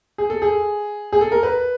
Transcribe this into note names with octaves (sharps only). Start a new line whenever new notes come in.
G#4
A4
G#4
G#4
A4
A#4
B4